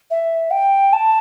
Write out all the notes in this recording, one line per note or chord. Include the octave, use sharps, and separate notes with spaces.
E5
G5
A5